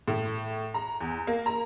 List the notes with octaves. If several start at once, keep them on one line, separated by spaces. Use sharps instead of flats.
A2
A#5
E2
A#3
A#5